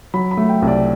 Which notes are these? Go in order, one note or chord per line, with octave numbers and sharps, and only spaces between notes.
F#3 B5
B5
A3
G5
C2
D5